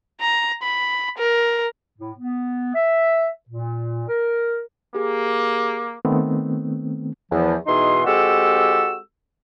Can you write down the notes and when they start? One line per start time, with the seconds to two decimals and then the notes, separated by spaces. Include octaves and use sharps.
0.21 A#5
0.63 B5
1.18 A#4
1.98 A2
2.18 B3
2.74 E5
3.49 A#2
4.08 A#4
4.95 A#3 G4 G#4
6.05 D#3 A3 B3 C4
7.31 E2 F3
7.67 B2 E3 D#4 G#4 C6
8.05 G#3 C4 F#4 G4 A4 E6